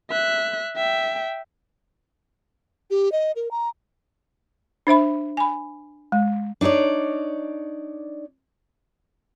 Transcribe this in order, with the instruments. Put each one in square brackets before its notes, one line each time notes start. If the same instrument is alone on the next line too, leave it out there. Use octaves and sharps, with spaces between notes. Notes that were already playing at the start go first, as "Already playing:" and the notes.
[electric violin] E5 F#6
E5 G5
[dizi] G4
D#5
A#4
A#5
[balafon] D4 C5 E5 B5
G#5 B5
G#3
[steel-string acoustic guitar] D4 D#4 F#4 C#5 D5